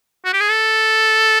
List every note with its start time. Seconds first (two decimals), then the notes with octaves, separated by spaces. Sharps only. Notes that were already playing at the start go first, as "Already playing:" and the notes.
0.25 F#4
0.33 G4
0.40 G#4
0.49 A4